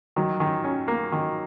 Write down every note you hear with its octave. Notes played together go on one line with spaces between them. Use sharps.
D#3 F#3
D#3
C#4
A#3
D#3